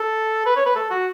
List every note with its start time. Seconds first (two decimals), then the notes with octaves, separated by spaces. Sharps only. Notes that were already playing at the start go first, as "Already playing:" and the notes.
Already playing: A4
0.46 B4
0.56 C#5
0.66 B4
0.76 A4
0.90 F#4